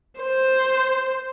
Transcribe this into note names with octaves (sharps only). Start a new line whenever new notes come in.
C5